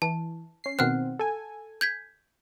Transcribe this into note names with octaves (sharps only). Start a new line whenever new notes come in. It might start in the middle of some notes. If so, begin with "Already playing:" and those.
E3 A5
C#4 C7
B2 D#3 C4 F#5 F6 F#6
A4 G#5
G6 G#6 B6